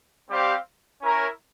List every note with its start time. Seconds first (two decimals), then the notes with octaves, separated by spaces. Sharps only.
0.30 G3 C4 G4 C5 F5
1.02 C#4 E4 A#4 C#5